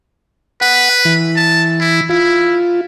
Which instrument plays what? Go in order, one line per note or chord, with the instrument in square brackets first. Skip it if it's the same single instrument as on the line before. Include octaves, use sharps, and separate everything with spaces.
[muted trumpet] B4 [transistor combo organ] F#5
[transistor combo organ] E3
[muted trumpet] A5
E4
[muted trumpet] E4 [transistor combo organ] F4